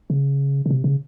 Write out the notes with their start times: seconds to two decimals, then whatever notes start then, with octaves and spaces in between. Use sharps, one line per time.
0.10 C#3
0.66 C#3
0.71 C3
0.84 C#3